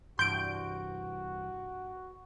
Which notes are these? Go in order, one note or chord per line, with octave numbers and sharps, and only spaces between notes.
C2 G2 E3 F#4 C6 G6 D7